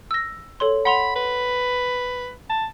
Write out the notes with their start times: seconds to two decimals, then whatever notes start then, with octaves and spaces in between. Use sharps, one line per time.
0.11 E6 A#6
0.60 A4 C#5 C6
0.85 F#5 B5 C6 F7
1.16 B4
2.50 A5